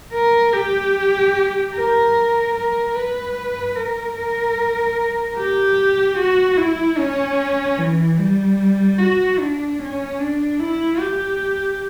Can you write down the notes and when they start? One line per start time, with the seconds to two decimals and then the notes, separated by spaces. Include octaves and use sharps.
0.13 A#4
0.53 G4
1.74 A#4
2.55 A#4
2.96 B4
3.76 A#4
4.16 A#4
5.36 G4
6.17 F#4
6.57 E4
6.98 C#4
7.78 E3
8.18 G3
8.98 F#4
9.39 D4
9.79 C#4
10.20 D4
10.60 E4
11.00 G4